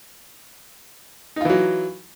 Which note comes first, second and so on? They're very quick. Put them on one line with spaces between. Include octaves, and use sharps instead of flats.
D#4 F4 E3 F#3